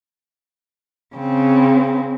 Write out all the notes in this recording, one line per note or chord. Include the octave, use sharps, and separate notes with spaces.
C#3 C4